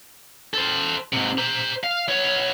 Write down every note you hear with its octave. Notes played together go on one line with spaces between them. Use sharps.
A4 C5
G#2 C3
C5 A#5
F5
B3 C#5